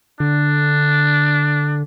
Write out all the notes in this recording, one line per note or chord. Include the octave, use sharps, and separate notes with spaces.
D3 D4